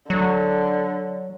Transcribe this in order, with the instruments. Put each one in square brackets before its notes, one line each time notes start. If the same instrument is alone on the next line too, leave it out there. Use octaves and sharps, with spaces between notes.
[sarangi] D3 [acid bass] F#3